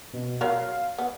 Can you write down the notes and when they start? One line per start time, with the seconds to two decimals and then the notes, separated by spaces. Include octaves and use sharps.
0.13 B2
0.41 F#3 F4 A#4 F5
0.98 B3